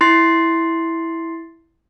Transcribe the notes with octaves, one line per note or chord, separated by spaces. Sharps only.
E4 C6 A6 C7